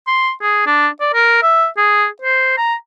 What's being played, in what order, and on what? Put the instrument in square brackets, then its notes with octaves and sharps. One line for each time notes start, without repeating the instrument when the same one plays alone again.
[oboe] C6
G#4
D4
D5
A#4
E5
G#4
C5
A#5